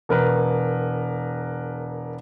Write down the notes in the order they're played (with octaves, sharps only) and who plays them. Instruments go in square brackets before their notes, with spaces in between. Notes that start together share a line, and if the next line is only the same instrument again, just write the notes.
[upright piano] E1 A#4 B4